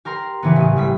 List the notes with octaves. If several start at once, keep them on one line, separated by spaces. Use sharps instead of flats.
G4 A#4 A#5 C6
C#3 E3 B3
A1 D#6
A2 G3 B6